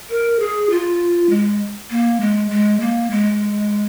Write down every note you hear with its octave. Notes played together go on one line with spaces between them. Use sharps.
A#4
G#4
F4
G#3
A#3
G#3
G#3
A#3
G#3